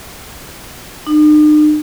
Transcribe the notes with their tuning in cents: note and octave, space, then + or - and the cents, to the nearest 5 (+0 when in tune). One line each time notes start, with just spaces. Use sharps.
D#4 -45